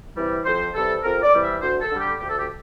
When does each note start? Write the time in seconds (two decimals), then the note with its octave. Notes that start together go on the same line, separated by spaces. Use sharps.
0.16 C3 E3 G3
0.45 F2 C5
0.75 C3 E3 G3 A4
1.04 F2 A#4
1.23 D5
1.33 C3 E3 G3
1.42 E5
1.61 D2 C5
1.81 A4
1.91 D3 G3
2.01 G4
2.20 D2 G4
2.29 A4
2.39 G4